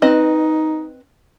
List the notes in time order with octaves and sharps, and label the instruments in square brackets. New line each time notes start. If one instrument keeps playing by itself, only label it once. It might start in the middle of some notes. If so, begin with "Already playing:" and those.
[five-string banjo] C4 B4 D#5 [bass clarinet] D#4